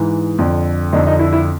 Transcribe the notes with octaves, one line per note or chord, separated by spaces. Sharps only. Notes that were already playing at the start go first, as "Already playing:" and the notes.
Already playing: G#2 E3
F2 D3
F2 D3 D#4
D#4
E4
E4